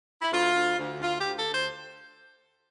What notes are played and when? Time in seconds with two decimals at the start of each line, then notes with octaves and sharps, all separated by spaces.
0.21 E4
0.31 D2 F4
0.55 D2
0.78 D2
1.01 D2 F4
1.18 G4
1.24 D2
1.35 A4
1.47 D2 C5